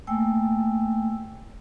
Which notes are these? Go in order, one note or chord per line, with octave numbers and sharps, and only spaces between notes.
A3 A#3 G5 G#5 E6